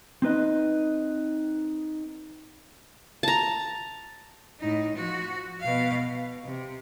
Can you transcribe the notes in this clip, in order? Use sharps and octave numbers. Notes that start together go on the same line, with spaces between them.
C4 D#4 B4 D#5
A5 A#5
A2 D#4
F3 F#4
B2 F5
B2
C3